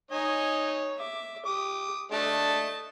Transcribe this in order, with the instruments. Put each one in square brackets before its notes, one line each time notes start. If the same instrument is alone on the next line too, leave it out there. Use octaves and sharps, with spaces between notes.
[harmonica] D#4 C#5 [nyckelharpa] D#5 G#5
[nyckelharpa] E5 D6
[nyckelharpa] G4 [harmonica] D6 D#6
[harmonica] A3 D4 [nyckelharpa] D#5 A5